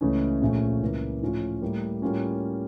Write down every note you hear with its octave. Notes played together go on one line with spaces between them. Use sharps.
C#2 C#3 E3 A3 C#4
A#1 A#2 A3 C#4
C#2 C#3 E3 A#3
A2 F3 C#4 F4
A2 G3 A#3
A2 G3 A#3 C#4 F4